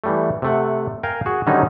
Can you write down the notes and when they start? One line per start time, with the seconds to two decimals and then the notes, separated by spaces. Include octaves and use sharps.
0.04 E3 G3 A3
0.42 C3 A3 F#5
1.03 A#4 F5 G5 G#5
1.26 F#4 G#4
1.47 D3 D#3 F#3 G3 C#4 D#4